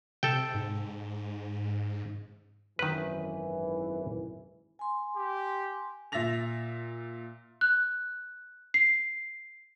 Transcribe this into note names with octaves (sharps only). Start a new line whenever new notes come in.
C3 A4 G5
G#2
G#1 F#2 D#3 E3 B4
G#5 C6
G4
A#2 E5 A6 A#6 F7
F#6
C7